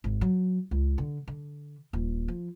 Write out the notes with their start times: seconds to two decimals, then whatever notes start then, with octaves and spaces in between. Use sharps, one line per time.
0.04 G#1
0.21 F#3
0.71 C#2
0.98 D3
1.28 D3
1.93 D#1
2.28 F3